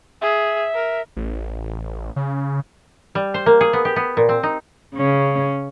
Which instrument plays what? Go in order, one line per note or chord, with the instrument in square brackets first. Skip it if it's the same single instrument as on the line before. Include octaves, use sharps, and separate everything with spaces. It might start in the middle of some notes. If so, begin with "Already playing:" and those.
[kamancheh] G#4 [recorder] E5
[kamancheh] A#4
[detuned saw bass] A1
C#3
[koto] G3
C5
A#3
G#4
B3
G4
B3
A#2
C4
D#4
[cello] C#3 C#4